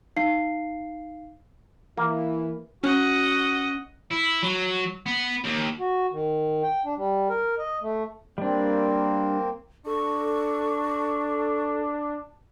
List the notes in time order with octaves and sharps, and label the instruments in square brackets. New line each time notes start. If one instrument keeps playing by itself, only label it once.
[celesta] D#4 F5 C7
[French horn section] E3 [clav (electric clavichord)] A#3
[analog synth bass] C#4 [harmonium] F#4 [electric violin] D#5 F#5
[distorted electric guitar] E4
F#3
B3
D#2
[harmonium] F#4
D#3
G5
D4
G3
A#4
D#5
A3
[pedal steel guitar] G3 D4 [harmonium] A#3 C4
[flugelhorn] D4 [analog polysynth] A4 [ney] C#6